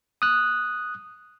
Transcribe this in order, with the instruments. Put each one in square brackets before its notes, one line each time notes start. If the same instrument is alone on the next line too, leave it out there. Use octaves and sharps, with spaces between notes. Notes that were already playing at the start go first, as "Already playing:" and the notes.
[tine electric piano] D#6 F#6